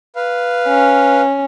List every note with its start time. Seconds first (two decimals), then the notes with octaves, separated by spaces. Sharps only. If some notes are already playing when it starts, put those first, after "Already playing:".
0.16 B4 F5
0.68 C#4